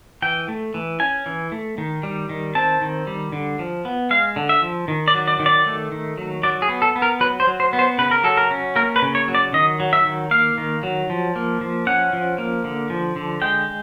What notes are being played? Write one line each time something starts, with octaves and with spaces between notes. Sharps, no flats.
E3 G5
A3
E3
C#4 G#5
E3
A3
D#3
G3
D#3
C4 A5
D#3
G3
D3
F3
B3
G#3 F5
D3
E5
F3
D#3
D5
F#3
D5
D#3
D5
A3
D#3
F#3
F#3 D5
G#4
B3
A4
B3
A#4
F#3 B4
C5
F#3
C5
B3
C5
C#3 B4
A#4
F#3 A4
A#4
C#4
A#3 A#4
B4
C#3
C#5
F#3
D5
D#3 D#5
F#3
E5
D#3
A#3 F5
D#3
F#3
F3
A#3
F3
C#4 F#5
F3
A#3
D3
F3
D3
G#3 G5